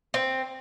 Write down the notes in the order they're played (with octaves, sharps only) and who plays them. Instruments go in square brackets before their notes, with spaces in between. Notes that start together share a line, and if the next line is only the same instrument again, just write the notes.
[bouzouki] C4